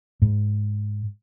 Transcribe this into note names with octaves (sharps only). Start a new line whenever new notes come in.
G#2